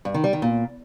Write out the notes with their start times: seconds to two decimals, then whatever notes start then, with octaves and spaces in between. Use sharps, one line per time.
0.05 G2
0.14 D#3
0.24 G3
0.33 D#3
0.42 A#2